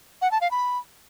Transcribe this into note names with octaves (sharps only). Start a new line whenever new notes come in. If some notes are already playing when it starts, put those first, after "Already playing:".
F#5
A5
F5
B5